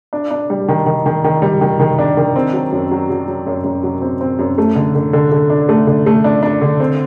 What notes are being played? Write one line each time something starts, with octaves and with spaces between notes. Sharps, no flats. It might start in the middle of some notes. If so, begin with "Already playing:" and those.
D4
D4
G3
D#3
D#3
D#3
D#3
G3
D#3
D#3
D4
D#3
C4
F#3
F#2
F#3
F#3
F#3
F#2
F#2
F#3
C4
C4
F#2
A3
D3
D3
D3
D3
D4
A3
D3
A3
D4
D4
D3
C4